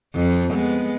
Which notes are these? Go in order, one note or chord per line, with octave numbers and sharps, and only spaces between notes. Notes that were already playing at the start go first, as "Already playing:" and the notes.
F2
G#3 B3